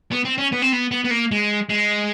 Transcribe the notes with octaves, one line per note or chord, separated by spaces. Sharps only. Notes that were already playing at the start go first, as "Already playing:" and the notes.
B3
C4
C#4
B3
C4
B3
B3
B3
A#3
G#3
G#3